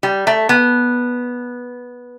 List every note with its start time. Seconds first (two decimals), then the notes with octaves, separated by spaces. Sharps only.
0.03 G3
0.27 A3
0.49 B3